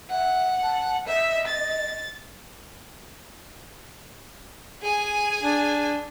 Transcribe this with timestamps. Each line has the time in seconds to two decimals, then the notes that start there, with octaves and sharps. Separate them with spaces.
0.10 E5 F#5
0.62 A5
1.07 D#5 E5
1.47 A6
4.81 G#4 G#5
5.42 D4